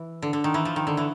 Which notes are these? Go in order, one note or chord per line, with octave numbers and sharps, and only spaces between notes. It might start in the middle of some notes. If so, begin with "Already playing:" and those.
Already playing: E3
D3
D3
D#3
E3
F3
D#3
D3
E3